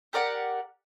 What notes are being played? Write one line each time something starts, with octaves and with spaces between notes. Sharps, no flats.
G4 A#4 D5 F#5